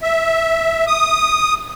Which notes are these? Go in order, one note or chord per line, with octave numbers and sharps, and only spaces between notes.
E5
D#6